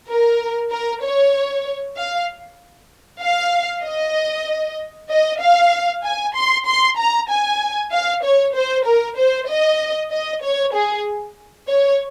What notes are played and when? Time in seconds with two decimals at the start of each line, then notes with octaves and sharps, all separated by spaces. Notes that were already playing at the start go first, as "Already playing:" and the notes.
0.08 A#4
0.70 A#4
1.02 C#5
1.97 F5
3.22 F5
3.84 D#5
5.10 D#5
5.41 F5
6.04 G#5
6.35 C6
6.66 C6
6.98 A#5
7.29 G#5
7.91 F5
8.23 C#5
8.55 C5
8.86 A#4
9.17 C5
9.49 D#5
10.11 D#5
10.43 C#5
10.74 G#4
11.68 C#5